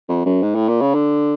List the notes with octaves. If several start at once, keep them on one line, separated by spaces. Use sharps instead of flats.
F2
F#2
G#2
A2
A#2
C#3
D3